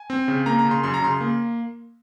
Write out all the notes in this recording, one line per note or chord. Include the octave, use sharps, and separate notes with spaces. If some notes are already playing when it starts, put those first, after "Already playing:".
Already playing: G#5
C4
C#3
A#3 A#5
A#5
C#3
C6
F#2 C6
A#5
C#3 C6
A#3